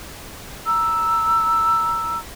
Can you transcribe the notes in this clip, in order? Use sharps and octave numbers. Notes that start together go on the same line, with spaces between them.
A#5 E6